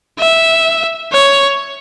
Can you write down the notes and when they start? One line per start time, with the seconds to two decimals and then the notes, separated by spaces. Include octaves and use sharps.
0.19 E5
1.13 C#5